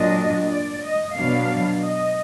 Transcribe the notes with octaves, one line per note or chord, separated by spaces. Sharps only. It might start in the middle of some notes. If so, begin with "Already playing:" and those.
Already playing: A#2 F#3 D4 D#5
D5
D#5
B2 F#3 D4 F5
D#5